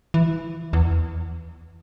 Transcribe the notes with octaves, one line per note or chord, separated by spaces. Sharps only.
E3
E2